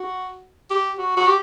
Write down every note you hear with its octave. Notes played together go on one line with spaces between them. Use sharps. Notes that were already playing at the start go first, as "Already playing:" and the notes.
Already playing: F#4
G4
F#4
F#4
G4